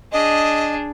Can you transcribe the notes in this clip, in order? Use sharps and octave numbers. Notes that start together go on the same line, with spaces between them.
D4 G#4 D#5